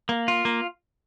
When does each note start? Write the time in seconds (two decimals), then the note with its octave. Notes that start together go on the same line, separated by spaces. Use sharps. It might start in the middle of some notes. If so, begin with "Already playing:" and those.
0.09 A#3
0.28 F4
0.45 A#3